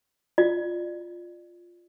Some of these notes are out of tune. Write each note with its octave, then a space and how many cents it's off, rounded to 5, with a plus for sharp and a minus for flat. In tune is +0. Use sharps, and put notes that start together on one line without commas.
F4 +0 D5 +25